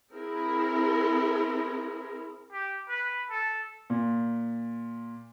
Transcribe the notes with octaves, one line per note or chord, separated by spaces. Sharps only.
C4 E4 G#4 A#4
G4
B4
A4
A#2